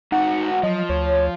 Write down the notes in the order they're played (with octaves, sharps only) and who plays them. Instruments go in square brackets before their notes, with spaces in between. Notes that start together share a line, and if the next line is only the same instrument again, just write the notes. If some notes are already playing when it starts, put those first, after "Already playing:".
[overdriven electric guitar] G#2 F#4 [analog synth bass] D#4 [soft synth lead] F#5
[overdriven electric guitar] F3 [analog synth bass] F#3 [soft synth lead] D#5
[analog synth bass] D2 [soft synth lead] C#5